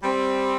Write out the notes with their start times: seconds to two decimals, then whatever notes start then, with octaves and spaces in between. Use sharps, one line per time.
0.03 G3 C4